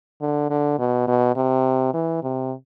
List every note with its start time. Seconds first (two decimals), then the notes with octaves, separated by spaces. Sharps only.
0.21 D3
0.50 D3
0.79 B2
1.08 B2
1.36 C3
1.94 E3
2.23 C3